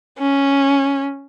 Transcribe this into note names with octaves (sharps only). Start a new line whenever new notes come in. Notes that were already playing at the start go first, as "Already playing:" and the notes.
C#4